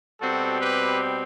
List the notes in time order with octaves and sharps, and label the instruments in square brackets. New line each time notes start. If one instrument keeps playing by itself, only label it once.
[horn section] B2 G3 C4 F#4 A4
G4 B4